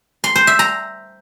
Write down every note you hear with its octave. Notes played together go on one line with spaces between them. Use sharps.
C6
C5
E5
A#5